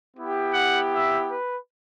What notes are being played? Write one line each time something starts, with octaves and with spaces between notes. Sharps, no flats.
B3 E4 G4
F#5
E5
B4